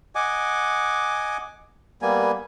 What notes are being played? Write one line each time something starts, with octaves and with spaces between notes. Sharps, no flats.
D#5 F#5 G#5 D6
G3 A#3 B3 G#5